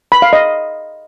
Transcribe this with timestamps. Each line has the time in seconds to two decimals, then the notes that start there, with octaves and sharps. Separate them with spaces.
0.12 B5
0.22 F5
0.33 D#5